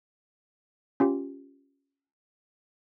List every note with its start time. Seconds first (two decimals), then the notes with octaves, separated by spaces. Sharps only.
1.00 C#4 F4 G4